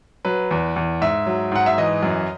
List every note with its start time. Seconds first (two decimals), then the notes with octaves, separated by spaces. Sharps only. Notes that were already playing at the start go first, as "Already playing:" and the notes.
0.25 F#3 B4
0.51 E2
0.76 E2
1.01 G#2 E5
1.26 F#3
1.52 G#2 F#5
1.66 E5
1.78 E3 D#5
2.03 F#2